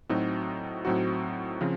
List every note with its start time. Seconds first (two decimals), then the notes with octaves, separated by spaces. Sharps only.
0.09 A2 F#3 C4 D#4 F#4
0.85 A2 F#3 C4 D#4 F#4
1.61 C#3 F3 C4